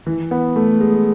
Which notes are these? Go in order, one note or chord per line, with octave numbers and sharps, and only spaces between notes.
E3
B3
A3
G#3